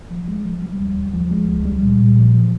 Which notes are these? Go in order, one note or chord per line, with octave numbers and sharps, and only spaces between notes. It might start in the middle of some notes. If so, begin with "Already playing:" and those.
F3
G#3
F3
G3
D#2
D#2
F3
G#3
C#2
G3
A#2
A#2
F3
F3